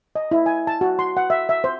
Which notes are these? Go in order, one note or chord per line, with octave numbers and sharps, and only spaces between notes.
D#5
E4
G#5
A5
F#4
C6
F#5
E5
E5
C5